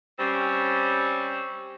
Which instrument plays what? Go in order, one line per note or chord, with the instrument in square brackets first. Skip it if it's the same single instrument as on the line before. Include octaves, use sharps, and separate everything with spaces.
[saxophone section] G3 C4 C#4